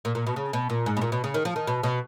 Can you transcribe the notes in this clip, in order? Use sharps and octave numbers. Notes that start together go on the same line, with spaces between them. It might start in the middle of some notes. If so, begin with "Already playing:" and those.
A#2
A#2
B2
C#3
B2
A#2
G#2
B2
A#2
B2
C#3
D#3
F3
D#3
B2
B2